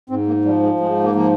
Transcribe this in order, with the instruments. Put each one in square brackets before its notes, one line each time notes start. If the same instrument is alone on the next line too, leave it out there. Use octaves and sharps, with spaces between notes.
[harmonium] G#2 C4
A#3
F3 G3
G#3
G#2 G#3
A#3
F3 A#3